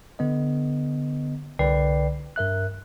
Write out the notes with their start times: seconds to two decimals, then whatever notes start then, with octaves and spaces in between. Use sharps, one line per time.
0.19 D3 B3 D#5
1.59 C2 D3 B4 D5 G5 C7
2.36 G2 A#4 E5 F#6